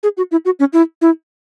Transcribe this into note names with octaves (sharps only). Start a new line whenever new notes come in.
G#4
F#4
E4
F#4
C#4
E4
E4